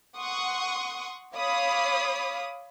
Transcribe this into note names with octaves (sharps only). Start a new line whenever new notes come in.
F#5 C6 C#6 D#6
C#5 F5 B5 D6 D#6